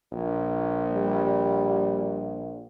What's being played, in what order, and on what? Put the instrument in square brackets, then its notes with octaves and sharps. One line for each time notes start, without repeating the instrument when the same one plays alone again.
[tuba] A#1
[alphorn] G3